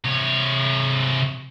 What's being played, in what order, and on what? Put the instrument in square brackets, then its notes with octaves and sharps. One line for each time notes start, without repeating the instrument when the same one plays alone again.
[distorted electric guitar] C3 C#5